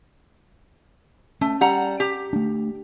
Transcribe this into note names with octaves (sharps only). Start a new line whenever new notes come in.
A3 C#4
G3 F#5 A#5
G4
A3 D4